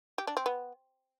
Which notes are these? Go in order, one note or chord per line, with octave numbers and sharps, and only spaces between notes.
G4
D4
C4
B3